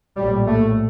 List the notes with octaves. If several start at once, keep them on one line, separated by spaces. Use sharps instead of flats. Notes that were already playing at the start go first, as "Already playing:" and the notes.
A#1 A2 G3
A3